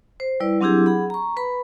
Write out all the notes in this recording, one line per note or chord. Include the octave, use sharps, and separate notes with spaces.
C5
G3 E4 B4 D5
F#3 C4 D4 E4 G4 G#4
G#4 F#5 B5
A#5 C#6
B4 B5